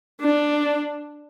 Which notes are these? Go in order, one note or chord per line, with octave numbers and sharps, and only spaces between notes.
D4